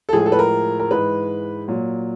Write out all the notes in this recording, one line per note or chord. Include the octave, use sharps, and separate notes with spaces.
A4
A2 F3 G#3 G#4
A4
B4
A#4
A#4
G#2 E3 G#3 B4
A#2 F#3